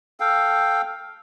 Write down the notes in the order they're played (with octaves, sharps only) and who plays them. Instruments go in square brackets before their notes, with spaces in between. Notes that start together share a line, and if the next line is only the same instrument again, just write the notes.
[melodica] A4 F5 G5